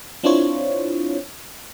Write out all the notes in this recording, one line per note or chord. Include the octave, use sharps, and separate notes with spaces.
C4 D4 E4 F4 C5 C#5